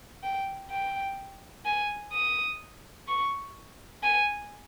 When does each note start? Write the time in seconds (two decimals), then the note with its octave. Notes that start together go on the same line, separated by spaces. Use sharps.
0.23 G5
0.71 G5
1.65 G#5
2.13 D#6
3.08 C#6
4.03 G#5